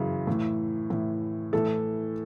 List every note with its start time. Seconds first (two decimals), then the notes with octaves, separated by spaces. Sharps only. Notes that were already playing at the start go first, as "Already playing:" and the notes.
Already playing: F#2 C#3 E3
0.27 A2 E3
0.90 A2 E3
1.53 A2 E3 A4